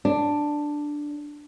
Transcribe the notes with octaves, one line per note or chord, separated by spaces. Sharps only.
D4